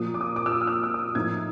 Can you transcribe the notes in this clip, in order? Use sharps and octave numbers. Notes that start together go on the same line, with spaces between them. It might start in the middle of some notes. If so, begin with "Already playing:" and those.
Already playing: A#2 F3 A#3 D#6
D6
D#6
D6
E6
D#6
F6
E6
E6
D#6
A2 F3 A#3 D#4 G#6